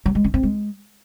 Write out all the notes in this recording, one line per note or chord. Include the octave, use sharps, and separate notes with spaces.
F#3
G#3
C#4
C4
G#3